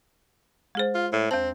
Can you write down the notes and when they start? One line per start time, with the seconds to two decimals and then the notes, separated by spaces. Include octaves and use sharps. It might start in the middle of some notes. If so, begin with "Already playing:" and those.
0.75 G#3 G#4 C5
0.95 F4
1.13 A2
1.31 E2 C4 A5